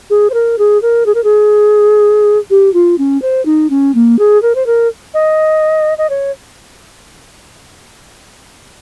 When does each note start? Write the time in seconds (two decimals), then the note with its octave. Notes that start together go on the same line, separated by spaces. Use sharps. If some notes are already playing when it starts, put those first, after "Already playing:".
0.10 G#4
0.30 C5
0.34 A#4
0.58 G#4
0.82 A#4
1.06 G#4
1.14 A#4
1.24 G#4
2.50 G4
2.73 F4
2.98 C#4
3.22 C5
3.45 D#4
3.70 C#4
3.95 A#3
4.19 G#4
4.42 A#4
4.55 C5
4.66 A#4
5.14 D#5
5.98 D#5
6.10 C#5